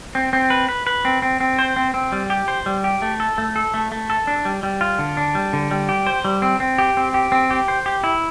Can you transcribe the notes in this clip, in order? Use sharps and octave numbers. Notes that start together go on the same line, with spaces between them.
C4
C4
B4
B4
B4
C4
C4
C4
C5
C4
C4
G3
G4
C5
G3
G4
A3
A4
A3
A4
A3
A3
A4
D4
G3
G3
F4
D3
D4
G3
D3
G3
G4
C5
G3
C4
C4
G4
C4
G4
C4
G4
C5
G4
E4